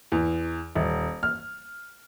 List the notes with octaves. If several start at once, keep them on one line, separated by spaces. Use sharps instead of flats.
E2
D#1
F6